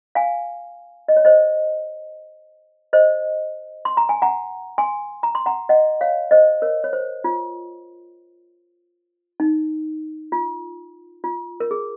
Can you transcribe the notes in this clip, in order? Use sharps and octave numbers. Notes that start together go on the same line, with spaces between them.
F5 G#5
D#5
C#5
C5 D#5
C5 D#5
C6
A#5
G#5
F#5 A#5
G#5 C6
A#5
C6
F#5 A#5
D#5 F#5
C#5 F5
C5 D#5
A#4 C#5
C#5
C5
F4
D#4
F4
F4
A#4
G#4